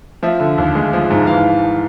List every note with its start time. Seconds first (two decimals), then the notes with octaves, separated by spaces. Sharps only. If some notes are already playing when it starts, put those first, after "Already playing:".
0.23 F3 E5
0.40 D3
0.58 D#2
0.75 G#3
0.93 F3
1.10 G#2
1.27 E3 F5